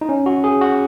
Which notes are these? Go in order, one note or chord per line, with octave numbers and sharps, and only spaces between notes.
D#4
C#4
F#4
G#4
F#4